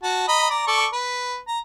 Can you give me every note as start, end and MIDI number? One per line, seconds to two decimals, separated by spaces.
0.03 0.23 66
0.03 0.23 81
0.28 0.49 75
0.28 0.49 82
0.28 0.49 83
0.50 0.65 74
0.50 0.65 82
0.67 0.86 69
0.67 0.86 74
0.67 0.86 85
0.93 1.38 71
1.48 1.59 82